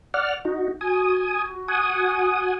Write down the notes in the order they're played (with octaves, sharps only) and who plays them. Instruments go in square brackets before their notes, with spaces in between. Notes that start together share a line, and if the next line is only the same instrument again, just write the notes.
[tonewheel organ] D5 F#5 F6
D#4 F#4
[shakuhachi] F#4 [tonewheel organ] G#5 D#6
[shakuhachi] F#4
[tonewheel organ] F#5 G#5 D#6